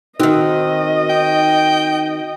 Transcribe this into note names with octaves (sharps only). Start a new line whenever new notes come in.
D#3 C4 D#4 F#4 D#5
G5